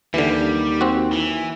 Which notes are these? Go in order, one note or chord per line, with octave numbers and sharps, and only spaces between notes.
D#2 D3 E3 G3
C4 F#4
E3